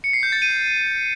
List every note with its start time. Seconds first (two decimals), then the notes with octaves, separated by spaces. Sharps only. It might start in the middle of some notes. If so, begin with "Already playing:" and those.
0.04 C#7
0.13 C7
0.23 G6
0.32 A6
0.42 D#7